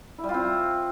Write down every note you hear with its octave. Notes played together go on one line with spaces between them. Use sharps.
E4
G3
F4
C4